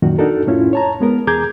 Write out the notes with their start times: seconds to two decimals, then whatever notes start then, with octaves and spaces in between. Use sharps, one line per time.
0.02 F#2 A#2 D#3 F#4
0.18 D4 D#4 F#4 A4 A#4
0.47 F2 A2 C#4 E4 F4
0.73 C#5 A5 A#5
1.00 G#3 B3 A#4
1.27 E2 G#4 A#5 D6 G6 G#6